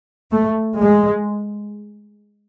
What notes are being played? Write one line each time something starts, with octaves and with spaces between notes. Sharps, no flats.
A3
G#3